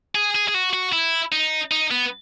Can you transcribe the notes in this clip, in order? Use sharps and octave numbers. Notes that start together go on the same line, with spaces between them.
G#4
G#4
G#4
F#4
F#4
E4
D#4
D#4
B3